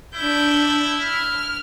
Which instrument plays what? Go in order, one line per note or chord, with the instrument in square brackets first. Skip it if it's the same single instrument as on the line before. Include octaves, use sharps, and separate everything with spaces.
[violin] D4 G6 [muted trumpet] E4
[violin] F6